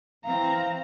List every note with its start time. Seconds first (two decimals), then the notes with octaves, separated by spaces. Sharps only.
0.24 E3 C4 F5 A#5